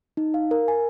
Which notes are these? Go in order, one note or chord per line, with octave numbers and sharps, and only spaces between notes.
D#4
F5
A#4
G#5